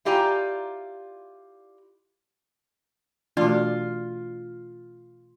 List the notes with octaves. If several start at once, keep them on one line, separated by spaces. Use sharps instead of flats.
E4 F4 G4 D5 G#5 A#5
B2 E3 A3 D4 F4 F#4